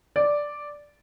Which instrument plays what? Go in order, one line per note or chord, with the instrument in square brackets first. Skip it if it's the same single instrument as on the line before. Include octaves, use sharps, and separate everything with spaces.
[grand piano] D5